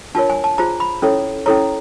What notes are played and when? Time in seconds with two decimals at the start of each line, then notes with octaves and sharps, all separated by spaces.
0.15 D4 F4 A#4 C#5 A5
0.30 G#5
0.44 A5
0.58 F4 G#4 C5 A#5
0.80 B5
1.02 C#4 E4 A4 C#5
1.46 C#4 E4 A4 C#5 A#5